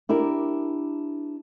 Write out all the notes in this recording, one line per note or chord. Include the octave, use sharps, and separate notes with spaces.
D4 E4 G4 A#4